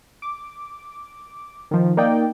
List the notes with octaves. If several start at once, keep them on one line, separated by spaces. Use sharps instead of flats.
D6
D#3 F3
A#3 D#4 D5 G5